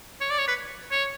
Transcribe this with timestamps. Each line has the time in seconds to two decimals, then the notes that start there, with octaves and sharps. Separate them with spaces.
0.21 C#5
0.30 D5
0.38 C#5
0.48 B4
0.91 C#5